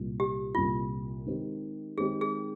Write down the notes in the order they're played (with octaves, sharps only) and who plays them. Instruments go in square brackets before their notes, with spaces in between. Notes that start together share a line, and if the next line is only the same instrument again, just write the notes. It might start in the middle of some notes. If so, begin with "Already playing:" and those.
Already playing: [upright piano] C2 A#2 G3
[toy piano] G4
[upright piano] C2 A#2 G3 [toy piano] F4
[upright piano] D#3 G#3 C4 G4
[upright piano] D#3 G#3 C4 G4 [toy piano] G#4
[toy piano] G#4